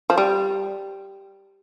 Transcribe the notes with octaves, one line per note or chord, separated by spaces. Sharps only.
F3
G3